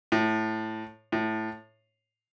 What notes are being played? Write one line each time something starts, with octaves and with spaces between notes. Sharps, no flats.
A2
A2